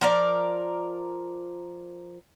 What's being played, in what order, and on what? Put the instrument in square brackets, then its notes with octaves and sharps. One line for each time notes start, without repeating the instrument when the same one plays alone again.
[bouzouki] F3 A#4 D5